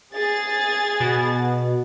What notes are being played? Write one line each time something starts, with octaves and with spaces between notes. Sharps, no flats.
G#4 A6
B2